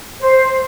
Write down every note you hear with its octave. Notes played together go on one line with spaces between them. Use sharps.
C5